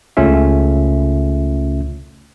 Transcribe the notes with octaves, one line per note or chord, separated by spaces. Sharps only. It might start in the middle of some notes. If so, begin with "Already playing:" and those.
C#2 C#3 A3 C#4 F4 E5